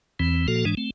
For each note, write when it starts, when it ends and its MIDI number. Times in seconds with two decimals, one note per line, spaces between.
0.20 0.47 40
0.20 0.47 52
0.20 0.47 60
0.48 0.65 46
0.48 0.65 53
0.48 0.65 58
0.48 0.65 66
0.48 0.65 69
0.65 0.75 44
0.65 0.75 52
0.65 0.75 56
0.65 0.75 62
0.77 0.90 57
0.77 0.90 60